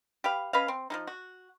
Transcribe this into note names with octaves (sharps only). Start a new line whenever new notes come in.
G4 B4 F5
C#4 B4 D#5 F5
C4
F3 G#3 D#4
F#4